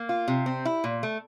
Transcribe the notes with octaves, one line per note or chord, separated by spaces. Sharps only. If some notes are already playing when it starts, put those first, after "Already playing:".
Already playing: A#3
F4
C3
C4
E4
A#2
A3